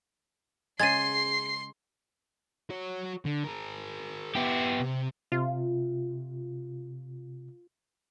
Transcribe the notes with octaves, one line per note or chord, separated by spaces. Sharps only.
C#3 G#3 C6 G#6 A6 C7 D#7
F#4 C#5
D3
G#4 A#4
B3 E4 G4
C3
C3 F4